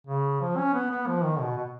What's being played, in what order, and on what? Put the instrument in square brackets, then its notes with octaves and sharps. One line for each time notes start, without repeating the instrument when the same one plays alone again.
[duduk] C#3
F3
C#4
B3
B3
F3
D#3
B2
B2